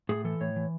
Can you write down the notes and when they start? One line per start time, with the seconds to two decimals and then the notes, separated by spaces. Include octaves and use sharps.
0.09 A2 G#4
0.25 E3 A4
0.41 A2 C#5
0.56 E3